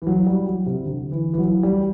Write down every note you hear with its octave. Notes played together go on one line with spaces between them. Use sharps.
E3
F#3
G3
F#3
C3
D3
E3
E3
F#3
G3